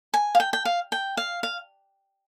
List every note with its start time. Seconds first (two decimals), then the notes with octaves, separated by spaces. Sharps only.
0.14 G#5
0.35 F5
0.40 G5
0.53 G5
0.65 F5
0.92 G5
1.17 F5
1.43 F5